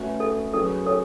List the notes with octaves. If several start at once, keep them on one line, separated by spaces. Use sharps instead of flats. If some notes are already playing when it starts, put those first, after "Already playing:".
Already playing: A3 C#4 F#4 B4
A4
F#3 C#4 G#4 A4 B4
A4 C#5